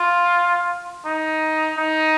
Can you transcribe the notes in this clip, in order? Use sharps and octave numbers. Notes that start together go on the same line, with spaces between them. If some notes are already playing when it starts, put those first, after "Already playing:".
Already playing: F4
D#4
D#4